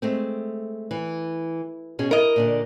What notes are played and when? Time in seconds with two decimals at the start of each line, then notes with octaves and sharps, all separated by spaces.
0.02 G#3 A3 C4
0.91 E3
1.99 B2 C#4 G#4
2.11 E4 A#4 D#5
2.36 A#2 D3 D4